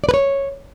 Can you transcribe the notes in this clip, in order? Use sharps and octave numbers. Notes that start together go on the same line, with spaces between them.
D5
B4
C#5